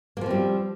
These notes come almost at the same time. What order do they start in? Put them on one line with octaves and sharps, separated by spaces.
A#3 F3 C4 G3